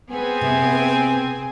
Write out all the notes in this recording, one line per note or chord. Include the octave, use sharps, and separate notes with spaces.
B3 C4 G#4 G#5
C3